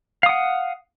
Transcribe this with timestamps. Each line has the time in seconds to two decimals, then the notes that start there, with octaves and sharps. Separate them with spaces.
0.23 F5
0.26 D#6
0.29 F#5